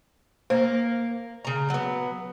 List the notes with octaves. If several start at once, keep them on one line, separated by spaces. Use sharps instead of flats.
A#3 C5
C#3 A#5
F#3 B3